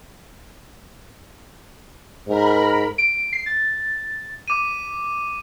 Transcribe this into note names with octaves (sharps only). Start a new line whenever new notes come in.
G#2 A#4 B5
D7
C7
A6
D6 D#7